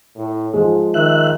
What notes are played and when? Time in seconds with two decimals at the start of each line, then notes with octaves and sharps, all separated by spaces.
0.15 A2
0.54 G#2 F3 G#3
0.94 D#3 E5 F#6